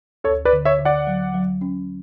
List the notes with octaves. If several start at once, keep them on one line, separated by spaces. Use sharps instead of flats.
D2 A4 C#5
B4 D5
D3
C#5 E5
D3
D5 F#5
F#3
F#3
C#4